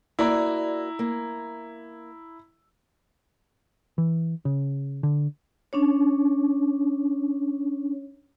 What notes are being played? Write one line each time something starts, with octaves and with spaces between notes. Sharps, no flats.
A#3 E4 F#4 D5 A#5
A#3
E3
C#3
D3
C#4 D4 C#5